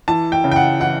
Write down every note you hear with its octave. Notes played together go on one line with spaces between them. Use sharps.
E3 A5
G5
C#3
G5
F#5
E3 F#5